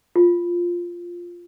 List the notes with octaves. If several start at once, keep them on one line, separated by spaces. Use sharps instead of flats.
F4